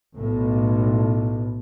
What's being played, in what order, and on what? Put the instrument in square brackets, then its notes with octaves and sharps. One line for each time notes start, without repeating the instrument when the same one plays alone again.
[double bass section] B1 A2